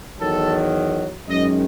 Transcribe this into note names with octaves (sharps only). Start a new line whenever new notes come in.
E2 D#3 F#3 A4
F#2 D#3 G#3 D#5